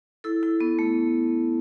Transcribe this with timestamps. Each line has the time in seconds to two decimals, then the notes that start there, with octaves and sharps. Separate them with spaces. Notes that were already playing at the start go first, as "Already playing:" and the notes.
0.24 E4 A4
0.43 E4
0.61 B3
0.79 A3